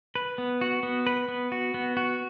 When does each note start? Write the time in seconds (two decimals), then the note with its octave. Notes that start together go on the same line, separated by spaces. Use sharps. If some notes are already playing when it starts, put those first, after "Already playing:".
0.15 B4
0.38 B3
0.61 F#4
0.83 B3
1.07 B4
1.28 B3
1.52 F#4
1.74 B3
1.97 F#4